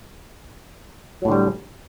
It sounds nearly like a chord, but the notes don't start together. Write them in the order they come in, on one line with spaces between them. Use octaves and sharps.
F#3 A2 D3 G3